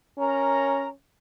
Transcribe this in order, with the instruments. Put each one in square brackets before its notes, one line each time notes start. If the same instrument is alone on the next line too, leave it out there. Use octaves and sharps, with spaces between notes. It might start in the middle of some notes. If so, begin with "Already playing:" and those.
[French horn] C#4 [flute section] A#4 A#5